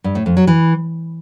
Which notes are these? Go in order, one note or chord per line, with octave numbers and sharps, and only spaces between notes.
G2
A2
F2
F#3
E3